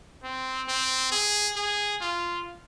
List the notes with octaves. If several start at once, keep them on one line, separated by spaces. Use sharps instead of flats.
C4
C4
G#4
G#4
F4